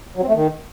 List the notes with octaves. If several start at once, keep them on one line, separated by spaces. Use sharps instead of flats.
F#3
C4
A3
D#3